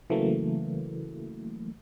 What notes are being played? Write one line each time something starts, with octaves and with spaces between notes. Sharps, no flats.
C#3 E3 F#3 A3 A#3